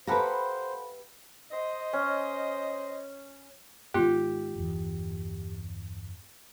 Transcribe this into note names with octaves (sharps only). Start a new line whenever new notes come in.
G4 A4 B4 C5 F5 F#5 A#5 B5
C5 D#5
C#4
G#2 D#3 B3 F4 G4
G1 E2